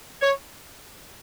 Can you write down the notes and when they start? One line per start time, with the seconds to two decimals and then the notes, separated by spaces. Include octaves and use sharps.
0.22 C#5